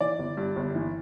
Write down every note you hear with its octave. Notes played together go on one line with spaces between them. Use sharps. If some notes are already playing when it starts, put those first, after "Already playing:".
E3 D5
G1
G2
G1
E3